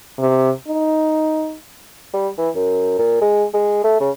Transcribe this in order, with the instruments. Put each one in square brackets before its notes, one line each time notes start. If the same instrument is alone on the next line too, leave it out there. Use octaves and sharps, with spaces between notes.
[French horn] C3
D#4
[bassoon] G3
E3
F#2
A#2
G#3
G#3
A3
C#3